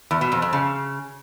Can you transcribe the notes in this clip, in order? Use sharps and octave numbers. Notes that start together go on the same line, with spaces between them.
E2
B2
F2
F2
C#3